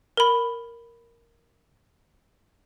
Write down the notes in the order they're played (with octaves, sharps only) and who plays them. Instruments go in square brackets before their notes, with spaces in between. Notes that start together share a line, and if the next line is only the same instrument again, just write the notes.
[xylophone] A#4 B5